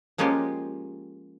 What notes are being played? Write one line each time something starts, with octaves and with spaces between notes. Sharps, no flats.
F3 G#3 A#3 C#4 F4 G4